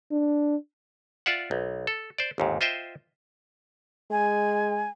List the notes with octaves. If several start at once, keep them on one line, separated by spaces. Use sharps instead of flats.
D4
F4 D5 E5 F#5
B1
A4
C5 D5
G1 D#2 G#2
F4 C5 D#5 E5 G5
G#3 G#5